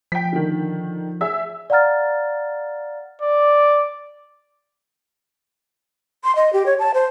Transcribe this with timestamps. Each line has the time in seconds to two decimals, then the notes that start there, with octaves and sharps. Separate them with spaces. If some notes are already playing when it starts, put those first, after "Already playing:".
0.12 F3 G5 B6
0.32 D3 D#3
1.21 G#4 E5 E6
1.70 D5 F5 F#5 A#5 F6 A6
3.22 D5
6.24 C6
6.36 D#5
6.53 G4
6.66 C#5
6.79 A5
6.94 C5